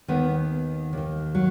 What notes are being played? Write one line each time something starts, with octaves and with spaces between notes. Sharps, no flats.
D#2 D#3 B3
D#2 D#3
F#3